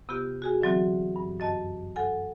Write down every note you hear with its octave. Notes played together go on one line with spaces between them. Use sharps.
C3 B3 F4 G4
F#4 G#4 G#5
D3 E3 F#3 C4 F#4
G2
F#2 D#5 A5
A4 F#5 G#5